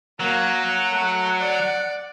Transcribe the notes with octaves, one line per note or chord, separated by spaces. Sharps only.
F#3 A#3 F#5
A3
D5